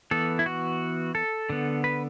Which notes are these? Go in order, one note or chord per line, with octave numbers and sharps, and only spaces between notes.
E3 B3 A4
E4
F#4
A4
D3 B3
B4